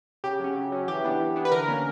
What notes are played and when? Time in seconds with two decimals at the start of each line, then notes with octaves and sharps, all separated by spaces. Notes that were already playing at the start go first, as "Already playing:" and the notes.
0.24 C#3 G4
0.40 F#3 C#4
0.56 C#3
0.72 F#3 C#4
0.88 E3 G4
1.04 B3 D4
1.20 E3
1.36 B3 D4
1.45 B4
1.52 D3 A#4
1.68 A#3 C#4